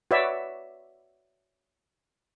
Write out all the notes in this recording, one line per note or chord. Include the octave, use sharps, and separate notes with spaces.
F#4 B4 C#5 D5 E5